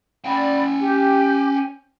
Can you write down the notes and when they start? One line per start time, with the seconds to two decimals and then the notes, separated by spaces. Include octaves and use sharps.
0.25 C#4 D5 G5 B5
0.81 G4